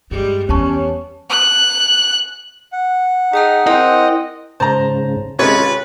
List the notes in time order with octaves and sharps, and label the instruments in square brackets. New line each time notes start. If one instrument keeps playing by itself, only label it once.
[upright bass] G2 [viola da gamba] G3 G#3
[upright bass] E2 [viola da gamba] G3 B3 [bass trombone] C#4 [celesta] C#5 A5 C#6
[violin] F#6
[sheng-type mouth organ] F#5
[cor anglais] D#4 [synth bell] G#4 G5 A5
[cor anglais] C4 [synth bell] E4 A#4 G#5 [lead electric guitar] D#5
[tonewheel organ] G#2 C#3 [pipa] C5 [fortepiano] A5 A#5
[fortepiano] C3 G#3 C#4 [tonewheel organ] F4 A4 [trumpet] B4 [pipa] C#5